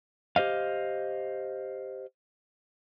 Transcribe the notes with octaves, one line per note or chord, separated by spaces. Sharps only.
G4 C5 D#5 F5